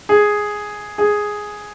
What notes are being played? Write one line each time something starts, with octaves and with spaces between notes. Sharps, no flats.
G#4
G#4